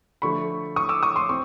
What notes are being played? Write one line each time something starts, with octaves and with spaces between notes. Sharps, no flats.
D3 F3 A3 B5 C#6
C#6 D#6
D6 E6
C#6 D#6
C6 D6
C4 C#6